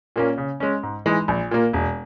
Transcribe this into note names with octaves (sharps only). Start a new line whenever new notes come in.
A#2 A#3 C#4
C#3
G#3 C#4
G#2
E3 G#3 D#4
A#1
A#2 A#3
E1